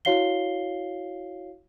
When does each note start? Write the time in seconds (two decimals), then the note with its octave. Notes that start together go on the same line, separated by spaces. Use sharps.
0.05 E4 F#4 C#5 F5 C7 G7